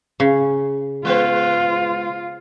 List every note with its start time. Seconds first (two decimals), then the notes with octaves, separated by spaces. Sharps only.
0.20 C#3
1.05 G#3 B3 F4 C5